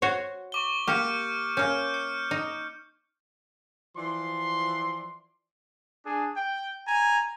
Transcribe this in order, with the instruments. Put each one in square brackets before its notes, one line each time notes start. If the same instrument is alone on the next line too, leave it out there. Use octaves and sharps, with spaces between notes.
[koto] F#4 C5 C#5
[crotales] C#6 D6 G7
[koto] A#3 G4 [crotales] F6 G6 C#7
[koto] A#3 C#4 [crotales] F6 G6
[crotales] C#7
[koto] D#4
[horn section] E3 F3 D5 C6
[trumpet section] D4 G#4
G5
G#5 A#5